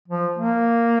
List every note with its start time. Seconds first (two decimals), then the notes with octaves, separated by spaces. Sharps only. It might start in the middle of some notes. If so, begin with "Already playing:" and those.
0.08 F3
0.38 A#3